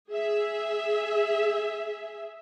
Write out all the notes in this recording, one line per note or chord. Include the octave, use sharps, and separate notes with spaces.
G#4 E5